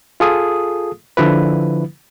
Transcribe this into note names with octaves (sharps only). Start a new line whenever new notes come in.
F4 G#4 A4 D#6
D3 F3 E4 B4